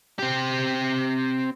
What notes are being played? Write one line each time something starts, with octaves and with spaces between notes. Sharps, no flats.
C4 G4